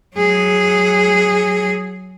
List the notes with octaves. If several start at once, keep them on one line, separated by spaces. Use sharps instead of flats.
F#3 G#4